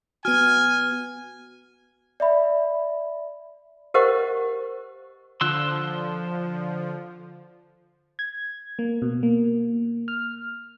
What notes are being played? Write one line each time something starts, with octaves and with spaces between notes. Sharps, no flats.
B3 F#4 G#5 F6
D5 E5 B5
G4 A#4 C5 D#5 F#5 C#6
D3 F3 C6 E6 F#6
G#6
A#3
B2
A#3
F6